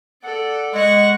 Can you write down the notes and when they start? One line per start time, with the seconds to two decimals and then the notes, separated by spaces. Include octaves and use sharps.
0.24 A4 D5 F#5
0.75 G#3 F#5 C#6